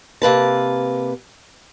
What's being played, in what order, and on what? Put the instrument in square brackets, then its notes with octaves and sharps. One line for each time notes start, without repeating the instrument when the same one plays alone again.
[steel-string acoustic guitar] C3 A#3 B4 A5